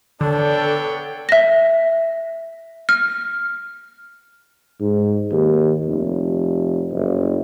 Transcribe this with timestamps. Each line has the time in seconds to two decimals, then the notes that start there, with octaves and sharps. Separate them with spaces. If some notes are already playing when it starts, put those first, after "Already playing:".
0.21 D3 B3 D4 A4 C#5 G5
1.29 E5 A#6
2.89 F6
4.80 G#2
5.32 D#2
5.87 F1
6.93 F#1